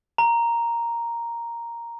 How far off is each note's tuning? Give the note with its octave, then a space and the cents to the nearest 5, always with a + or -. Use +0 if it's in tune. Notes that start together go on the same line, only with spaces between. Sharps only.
A#5 +0